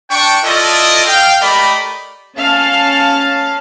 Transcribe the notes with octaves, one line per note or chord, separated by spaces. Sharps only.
D4 G5 C#6
E4 F4 A4 D5 D#5
F5 G5
A3 G4 A#4 D5 D#5 B5
C#4 F5 A5